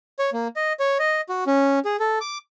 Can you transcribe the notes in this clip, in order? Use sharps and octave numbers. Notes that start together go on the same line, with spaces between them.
C#5
A#3
D#5
C#5
D#5
F#4
C#4
G#4
A4
D6